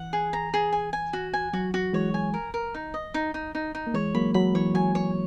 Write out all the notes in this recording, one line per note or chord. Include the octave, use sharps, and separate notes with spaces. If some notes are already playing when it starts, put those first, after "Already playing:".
Already playing: E3 F#5
G#4
A#5
G#4
G#5
G#5
F#4
G#5
F#3 F#4
F#4
E3 G#3 C#5
G#5
A#4
A#4
D#4
D#5
D#4
D#4
D#4
D#4
A#3
E3 G#3 C#5
F#3 A#3 B5
F#3 B5
E3 C#5
F#3 G#5
C#5